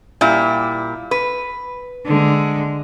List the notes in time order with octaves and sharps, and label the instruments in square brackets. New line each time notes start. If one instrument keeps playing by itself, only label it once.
[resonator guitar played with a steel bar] A#2 G3 E4
B4
[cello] D3 G#3